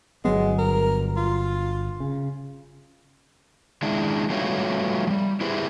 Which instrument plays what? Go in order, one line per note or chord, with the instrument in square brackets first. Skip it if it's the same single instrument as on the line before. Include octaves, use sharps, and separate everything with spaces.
[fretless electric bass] G1 F#3 B3 [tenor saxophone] G#3
[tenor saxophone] A#4
F4
[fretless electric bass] C#3
[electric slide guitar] D#3 G#3 D4 E4
G3 A3 B3 F4 F#4 C#5
F3 G3
E4 G4 G#4 B4 C5 E5